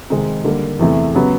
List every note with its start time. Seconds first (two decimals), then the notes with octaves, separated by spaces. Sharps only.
0.10 C3 D#3 G#3 C4 D#4
0.44 D3 G3 A#3
0.79 E2 C3 E3 A3
1.15 C#3 F#3 B3